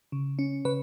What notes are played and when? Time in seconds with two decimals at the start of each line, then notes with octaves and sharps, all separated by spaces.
0.12 C#3
0.39 C#4
0.65 C#3 B4